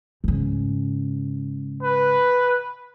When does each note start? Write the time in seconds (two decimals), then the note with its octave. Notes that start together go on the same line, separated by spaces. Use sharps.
0.24 G#2 C#3
1.83 B4